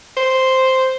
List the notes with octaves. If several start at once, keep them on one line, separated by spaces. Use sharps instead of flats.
C5